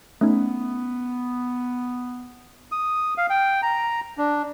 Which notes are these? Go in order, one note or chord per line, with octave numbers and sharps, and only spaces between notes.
A3 B3 C#4 D#4
D#6
F5
G5
A#5
D4